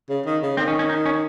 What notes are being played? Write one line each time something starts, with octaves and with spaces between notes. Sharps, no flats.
C#3
D#3
C#3
D#3 C4
C#4
C#4
D#4
C#4